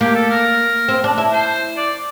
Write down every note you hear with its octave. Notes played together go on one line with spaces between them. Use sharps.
A#3 G4
A4
A#4
C4
D4
E4
C5
D5